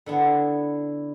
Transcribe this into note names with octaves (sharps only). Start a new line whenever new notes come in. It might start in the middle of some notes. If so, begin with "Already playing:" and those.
D3 B3 E4